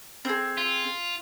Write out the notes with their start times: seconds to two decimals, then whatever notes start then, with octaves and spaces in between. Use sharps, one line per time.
0.25 C4 G#4
0.58 F4